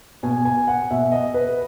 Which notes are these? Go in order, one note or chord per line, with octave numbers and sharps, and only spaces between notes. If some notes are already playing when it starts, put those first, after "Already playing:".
B2 G#5
G#5
F#5
B2 E5
D#5
B4